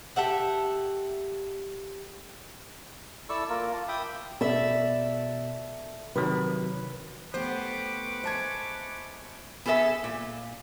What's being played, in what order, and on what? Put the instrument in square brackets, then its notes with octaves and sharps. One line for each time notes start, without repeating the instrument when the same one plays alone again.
[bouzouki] G4 A4 E5 F#5
[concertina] E4 A4 D5 A5 C#6 E6
A#3 F4 A#4
F4 A5
E5 G5 B5 D6 D#6
[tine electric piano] B2 [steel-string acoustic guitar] A4 D5 E5
[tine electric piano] C3 D#3 F#3 [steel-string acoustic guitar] B4
[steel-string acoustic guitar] A3 B3 G4 [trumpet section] B4 C#6 D6 [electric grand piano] C5
[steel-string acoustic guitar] G#3 E5 [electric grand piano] C5 A5 G#6
[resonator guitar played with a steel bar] B3 G#4 A4 B4 E5 G#5
A#2